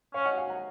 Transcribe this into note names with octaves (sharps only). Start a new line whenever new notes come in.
C#4 C#5 F5
D#5 F#5
F5 G#5
F#5 A#5